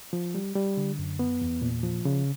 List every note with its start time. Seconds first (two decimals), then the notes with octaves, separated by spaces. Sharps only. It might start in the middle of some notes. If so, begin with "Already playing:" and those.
0.13 F3
0.35 G3
0.56 G3
0.77 D3
0.99 F#2
1.19 B3
1.42 E2
1.62 A#2
1.83 F3
2.05 C#3